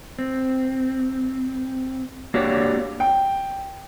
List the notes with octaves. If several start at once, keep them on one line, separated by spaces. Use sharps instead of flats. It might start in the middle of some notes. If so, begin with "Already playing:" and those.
C4
A#3 D4 F#4 G4 C#5
G5